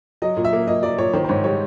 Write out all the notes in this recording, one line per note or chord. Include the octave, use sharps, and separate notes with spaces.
F#3 D#5
A#2
E5
A#3
A#2 D#5
F#3 D5
A#2 C#5
D#3 C5
C5
G#2 C#5
G3 C#5